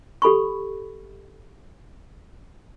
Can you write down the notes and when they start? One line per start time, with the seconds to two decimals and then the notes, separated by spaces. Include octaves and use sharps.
0.22 G4 A4 B5 C#6